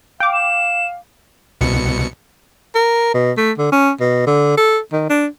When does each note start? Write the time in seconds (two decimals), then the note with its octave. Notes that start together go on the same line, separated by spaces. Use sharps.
0.20 F5 G5 D6
0.33 E7
1.61 C2 B2 C#7
2.75 A#4
3.14 B2
3.37 A3
3.58 D3
3.72 C#4
4.00 B2
4.27 D3
4.57 A4
4.92 D#3
5.10 D4